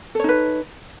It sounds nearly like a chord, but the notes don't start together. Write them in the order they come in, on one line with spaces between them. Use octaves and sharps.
A4 C#5 D#4 B4